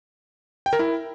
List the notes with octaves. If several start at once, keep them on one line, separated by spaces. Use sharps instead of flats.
G5
A#4
E4